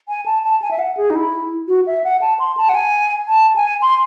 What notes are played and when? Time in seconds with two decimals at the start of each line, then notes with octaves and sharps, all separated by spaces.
0.09 G#5
0.26 A5
0.43 A5
0.62 G#5
0.71 E5
0.79 F#5
0.97 G#4
1.10 D#4
1.15 E4
1.68 F#4
1.87 E5
2.04 F#5
2.21 A5
2.39 C6
2.57 A5
2.69 F#5
2.75 G#5
3.28 A5
3.56 G#5
3.82 C6